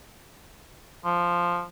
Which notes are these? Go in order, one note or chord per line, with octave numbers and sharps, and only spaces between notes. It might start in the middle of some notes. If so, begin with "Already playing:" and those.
F3